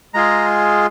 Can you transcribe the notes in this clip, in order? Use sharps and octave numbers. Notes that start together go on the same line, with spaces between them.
G#3 F4 G#4 A#5